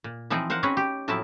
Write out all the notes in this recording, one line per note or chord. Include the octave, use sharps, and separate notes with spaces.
A#2
E3 F3 C4 D#4 G#4
A#4 C5 F5 F#5
C4 C#4 F#4 G#4 B4 C#5
G4
A2 F3 F#3 C4 E4 A5